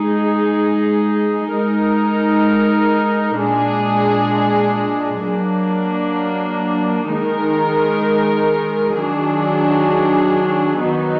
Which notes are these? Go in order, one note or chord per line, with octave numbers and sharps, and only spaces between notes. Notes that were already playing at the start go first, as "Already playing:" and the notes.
Already playing: G#3 D#4 G#4
G#3 D#4 A#4
A#2 G#3 D4 G#4
F#3 A#3 D4
D#3 G#3 D#4 A#4
D#3 F#3 D4 G#4
D#3 F#3 B3 D#4